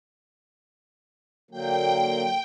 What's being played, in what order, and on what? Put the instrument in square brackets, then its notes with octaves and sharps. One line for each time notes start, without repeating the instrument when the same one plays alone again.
[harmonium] D3 F#3 A#3 [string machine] G5